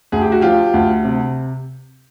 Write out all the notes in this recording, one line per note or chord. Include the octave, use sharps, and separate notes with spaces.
D2 G#4
G4
F#4
F3 F4 G4
D2
C3